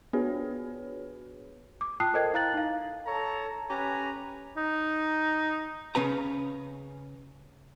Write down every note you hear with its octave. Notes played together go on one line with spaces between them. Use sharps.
B3 D4 F#4 G#4 B4 C#5
D6
F4 G5 A5 D#6 F#6 C7
A4 A#4 C5 D#5 G5 G#6
E4 F5 A#5 F#6 A6 F#7
D#4 F5
A4 C#5 A5 A#5
C#4 G4 B4 G#5 A#5
D#4
C#3 C#4 B4 A#5